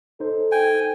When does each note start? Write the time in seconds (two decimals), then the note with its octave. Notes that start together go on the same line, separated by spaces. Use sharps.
0.20 D#4 A4 C5
0.52 G5 G#5